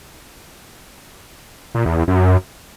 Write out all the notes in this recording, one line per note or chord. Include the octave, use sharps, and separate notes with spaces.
A#2
E2
E2
F#2